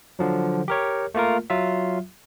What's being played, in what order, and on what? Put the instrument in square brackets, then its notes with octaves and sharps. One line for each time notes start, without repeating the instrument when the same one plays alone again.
[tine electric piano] D3 F3 F#3
G4 A#4 C#5
A3 A#3 F4 A#4
F#3 F4 E5